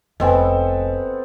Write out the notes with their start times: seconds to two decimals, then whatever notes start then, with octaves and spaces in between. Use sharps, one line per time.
0.20 F1 B3 C4 A4 D#5 G#5